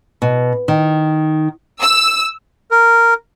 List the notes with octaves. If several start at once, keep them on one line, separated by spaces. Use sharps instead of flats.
B2
D#3
E6
A#4